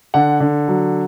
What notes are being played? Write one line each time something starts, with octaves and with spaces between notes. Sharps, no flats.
D3 F#5
D3
F#3